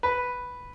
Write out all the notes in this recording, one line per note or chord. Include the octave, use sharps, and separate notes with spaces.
B4